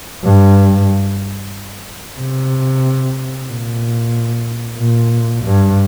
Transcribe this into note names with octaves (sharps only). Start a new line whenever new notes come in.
G2
C3
A#2
A#2
G2